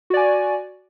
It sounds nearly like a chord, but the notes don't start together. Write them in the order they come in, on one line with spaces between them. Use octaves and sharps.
F#4 D5 G#5